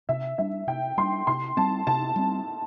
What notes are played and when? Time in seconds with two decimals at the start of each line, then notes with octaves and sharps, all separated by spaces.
0.09 C3 E5
0.38 G3 D4 E5
0.67 C3 G5
0.97 G3 C6
1.02 D4
1.27 C3 C6
1.57 G3 C4 A5
1.87 C3 A5
2.16 G3 C4